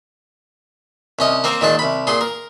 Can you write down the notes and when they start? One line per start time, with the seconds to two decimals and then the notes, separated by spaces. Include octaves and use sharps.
1.19 C2 C#4 D#5
1.44 A#3 C4 A#4
1.61 A#2 D#3 G#3 A5
1.79 C2 B5
2.07 A#2 G#4 C6
2.21 A#4